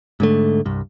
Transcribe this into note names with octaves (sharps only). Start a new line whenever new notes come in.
G#2 D3 A3
C2 G2